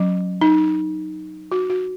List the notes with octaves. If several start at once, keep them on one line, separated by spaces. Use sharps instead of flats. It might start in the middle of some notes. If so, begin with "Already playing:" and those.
Already playing: F#3 C#4
D#4
F#4
F#4